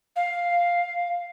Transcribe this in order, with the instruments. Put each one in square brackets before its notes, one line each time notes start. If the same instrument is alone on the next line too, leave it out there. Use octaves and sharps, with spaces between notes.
[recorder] F5